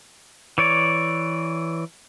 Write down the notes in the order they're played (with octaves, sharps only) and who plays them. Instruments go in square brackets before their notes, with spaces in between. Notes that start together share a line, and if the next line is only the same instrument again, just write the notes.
[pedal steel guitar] E3 C#5 D5